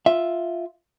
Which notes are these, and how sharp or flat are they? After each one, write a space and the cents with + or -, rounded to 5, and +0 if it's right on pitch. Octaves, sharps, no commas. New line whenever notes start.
F4 +0 E5 +0